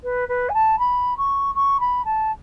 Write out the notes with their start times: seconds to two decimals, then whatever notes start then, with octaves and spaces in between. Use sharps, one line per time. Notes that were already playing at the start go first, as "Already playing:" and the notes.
0.04 B4
0.29 B4
0.49 G#5
0.54 A5
0.79 B5
1.17 C#6
1.55 C#6
1.80 B5
2.05 A5